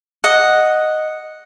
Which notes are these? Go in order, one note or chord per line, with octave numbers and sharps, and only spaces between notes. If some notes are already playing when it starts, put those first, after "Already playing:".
D#5 F#5